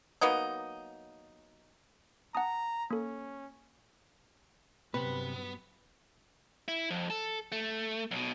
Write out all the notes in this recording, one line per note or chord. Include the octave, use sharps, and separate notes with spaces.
F#3 A#3 B3 D#4
F#5 A5 A#5 D#6
A#3 C#4 A4
G2 C3 F#3 B3 B4
E4
F2
A4
A3
B1 B2